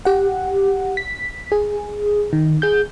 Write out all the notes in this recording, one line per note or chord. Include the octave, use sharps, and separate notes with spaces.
G4 F#5
B6
G#4
D#3
G#4 G6